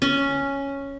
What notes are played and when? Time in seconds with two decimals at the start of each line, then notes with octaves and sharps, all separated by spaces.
0.02 C#4